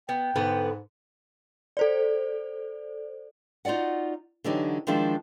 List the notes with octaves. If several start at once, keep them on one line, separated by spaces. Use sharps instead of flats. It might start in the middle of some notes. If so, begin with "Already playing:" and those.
B3 G5
G#2 D3 B3 B4
A4 C5 D5
D#4 F4 F#4 D5 F#5
D3 E3 F#3 D4 D#4 G4
D#3 F3 G#3 D4 E4